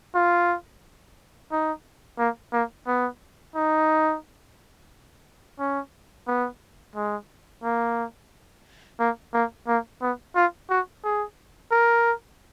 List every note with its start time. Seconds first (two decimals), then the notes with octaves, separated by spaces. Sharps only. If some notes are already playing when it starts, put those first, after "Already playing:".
0.15 F4
1.51 D#4
2.19 A#3
2.53 A#3
2.87 B3
3.55 D#4
5.59 C#4
6.27 B3
6.95 G#3
7.64 A#3
9.00 A#3
9.34 A#3
9.68 A#3
10.02 B3
10.36 F4
10.70 F#4
11.04 G#4
11.71 A#4